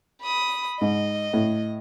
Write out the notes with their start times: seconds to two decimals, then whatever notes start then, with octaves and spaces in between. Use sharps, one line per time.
0.23 B5 D#6
0.81 G#2 D#5
1.33 A2